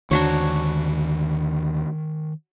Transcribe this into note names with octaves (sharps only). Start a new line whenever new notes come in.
D#2 D3 D#3 D4 F#4 C5 C#5 A#5